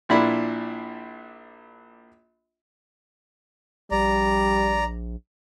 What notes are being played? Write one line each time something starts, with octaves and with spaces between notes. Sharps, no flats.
A#1 A#2 D4 E4 B5
A#1 G3 D5 A#5